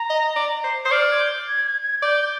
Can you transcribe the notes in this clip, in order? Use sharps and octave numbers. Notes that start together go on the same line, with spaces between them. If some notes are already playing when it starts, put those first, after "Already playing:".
Already playing: A#5
D#5
D5
C5
C5 D#6
D5 F6
G#6
G6
G#6
G#6
G#6
D5 G6
G6